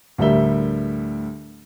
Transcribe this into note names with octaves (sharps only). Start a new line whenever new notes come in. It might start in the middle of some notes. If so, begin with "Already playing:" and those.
D2 A2 G3 A#4 E5 G7